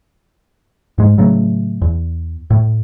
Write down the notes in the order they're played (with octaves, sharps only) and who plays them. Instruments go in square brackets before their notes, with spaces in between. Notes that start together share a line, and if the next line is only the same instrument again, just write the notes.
[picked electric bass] G#2 G#3
A2 C#3 F#3 A3
E2
A2